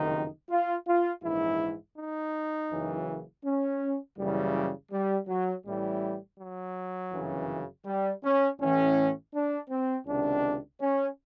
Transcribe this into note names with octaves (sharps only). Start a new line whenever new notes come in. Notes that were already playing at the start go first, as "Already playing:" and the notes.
Already playing: F#1 F2 C3 D#3 D#4
F4
F4
A#1 G#2 E3 E4
D#4
F#1 F#2 C#3 E3
C#4
F#1 F#2 C#3 E3 G3
G3
F#3
A1 A2 E3 G3
F#3
G1 F#2 C#3 E3
G3
C#4
A1 A2 E3 C#4
D4
C4
C#2 C3 D#3 D4
C#4